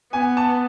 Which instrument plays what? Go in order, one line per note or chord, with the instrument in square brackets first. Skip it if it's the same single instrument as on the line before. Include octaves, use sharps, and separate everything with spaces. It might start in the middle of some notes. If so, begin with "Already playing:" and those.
[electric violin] B3 [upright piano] G#5
[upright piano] A5